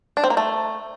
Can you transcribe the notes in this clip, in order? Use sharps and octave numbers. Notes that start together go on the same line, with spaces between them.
D4
C4
A#3
A3